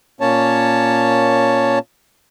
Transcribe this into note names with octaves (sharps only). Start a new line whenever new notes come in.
A#2 A#3 C#4 C#5 A5